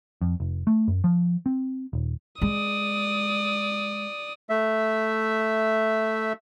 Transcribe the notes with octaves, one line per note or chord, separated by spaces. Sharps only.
F2
F1
A3
F#2
F3
C4
D#1
G#3 D5 D#6
A3 E5